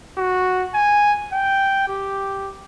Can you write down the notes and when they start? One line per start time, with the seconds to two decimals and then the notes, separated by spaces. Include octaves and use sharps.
0.18 F#4
0.74 G#5
1.33 G5
1.88 G4